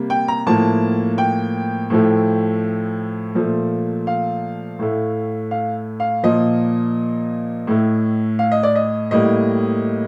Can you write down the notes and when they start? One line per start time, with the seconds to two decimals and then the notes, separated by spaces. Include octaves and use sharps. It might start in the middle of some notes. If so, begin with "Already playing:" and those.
Already playing: C3 G3 A#3
0.10 G5
0.28 A#5
0.47 A2 F3 A#3 A5
1.18 G5
1.90 A2 F3 A3
3.35 A#2 F3 A3
4.07 F5
4.79 A2 A3
5.51 F5
6.00 F5
6.23 A#2 F3 A#3 D#5
7.67 A2 A3
8.39 F5
8.51 D#5
8.63 D5
8.75 D#5
9.11 A2 G3 A#3 D#5